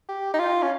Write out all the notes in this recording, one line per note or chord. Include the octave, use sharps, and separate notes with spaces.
G4
D#4
F4
C#4